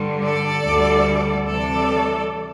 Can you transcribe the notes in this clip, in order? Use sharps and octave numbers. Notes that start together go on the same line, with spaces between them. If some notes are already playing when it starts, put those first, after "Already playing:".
Already playing: G2 D3 G3
A4 D5
D2 D3 G3
D2 C3 E3 G3 A4 D5